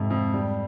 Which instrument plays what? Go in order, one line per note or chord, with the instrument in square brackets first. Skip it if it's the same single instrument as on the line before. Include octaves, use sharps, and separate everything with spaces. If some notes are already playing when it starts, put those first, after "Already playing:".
Already playing: [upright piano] F2 C3 [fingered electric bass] G#2
[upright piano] F2
G3